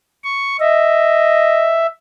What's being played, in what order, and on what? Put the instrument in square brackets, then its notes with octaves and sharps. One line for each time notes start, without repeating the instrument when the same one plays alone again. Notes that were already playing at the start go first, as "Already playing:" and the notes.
[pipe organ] C#6
[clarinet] D#5 [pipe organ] E5